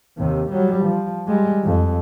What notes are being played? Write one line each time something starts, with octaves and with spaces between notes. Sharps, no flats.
D#2 C3
F#3 G3
F3
G3 G#3
F2